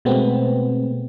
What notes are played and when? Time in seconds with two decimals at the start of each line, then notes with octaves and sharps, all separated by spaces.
0.05 B2 G#3 A3 B3 C4